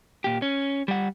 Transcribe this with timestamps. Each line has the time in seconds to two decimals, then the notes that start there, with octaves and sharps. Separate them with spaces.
0.24 A#2 G4
0.42 C#4
0.88 G3 F#5